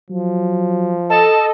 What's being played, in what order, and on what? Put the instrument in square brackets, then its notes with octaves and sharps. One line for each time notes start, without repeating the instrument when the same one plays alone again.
[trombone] F3 [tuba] F#3
[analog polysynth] A4 D#5 [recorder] A5